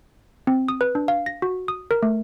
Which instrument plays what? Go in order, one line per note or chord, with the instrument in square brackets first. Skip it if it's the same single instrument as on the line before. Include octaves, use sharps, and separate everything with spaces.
[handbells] C4
D#6
B4
D4
F5
A#6
F#4
D#6
A#4
A3